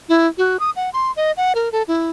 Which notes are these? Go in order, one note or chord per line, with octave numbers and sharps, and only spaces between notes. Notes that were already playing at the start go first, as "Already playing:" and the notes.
E4
F#4
D#6
F#5
C6
D#5
F#5
A#4
A4
E4